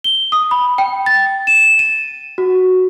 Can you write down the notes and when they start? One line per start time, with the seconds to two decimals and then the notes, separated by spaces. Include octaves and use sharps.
0.04 G7
0.32 D#6
0.51 B5
0.78 G5
1.06 A6
1.47 E7
1.79 D#7
2.38 F#4